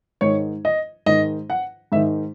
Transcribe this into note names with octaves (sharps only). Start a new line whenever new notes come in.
G#2 D#3 C#5
D#5
G#2 D#3 D#5
F#5
G#2 D#3 E5